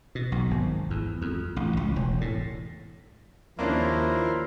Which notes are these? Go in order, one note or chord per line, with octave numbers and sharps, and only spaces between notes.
B2
B1
G#1
E2
F2
A1
C#2
E1
A2
D#2 F3 A#3 C#4 D4 E4 A#4 C5